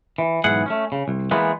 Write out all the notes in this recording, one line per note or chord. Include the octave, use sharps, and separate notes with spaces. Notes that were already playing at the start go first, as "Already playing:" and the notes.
E3
B1 G#2 E3 G#4 F#5
A3 C#4
C#3
C2
E3 G#3 A#3 B3